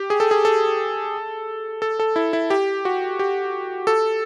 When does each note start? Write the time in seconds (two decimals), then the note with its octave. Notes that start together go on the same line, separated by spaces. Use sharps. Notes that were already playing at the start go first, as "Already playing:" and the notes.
Already playing: G4
0.10 G#4
0.20 A4
0.31 G#4
0.45 A4
1.82 A4
2.00 A4
2.16 E4
2.33 E4
2.50 G4
2.85 F#4
3.19 G4
3.87 A4